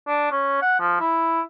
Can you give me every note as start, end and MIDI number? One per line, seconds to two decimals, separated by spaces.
0.07 0.31 62
0.31 0.61 61
0.62 0.78 78
0.80 0.99 53
1.00 1.41 64